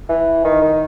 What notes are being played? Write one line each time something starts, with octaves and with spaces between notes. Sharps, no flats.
E3
D#3
D#3